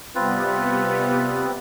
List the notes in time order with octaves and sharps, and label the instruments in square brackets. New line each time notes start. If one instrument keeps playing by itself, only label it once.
[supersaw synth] C3 G3 B3 [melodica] C4 F4 B4